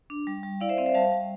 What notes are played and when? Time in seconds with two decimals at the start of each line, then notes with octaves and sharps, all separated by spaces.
0.10 D4
0.27 G3
0.43 G3
0.61 E4 D5 F5
0.69 C5 E5
0.78 C4 D5 F5
0.86 C5 E5
0.94 G3 F5 A5
1.12 G3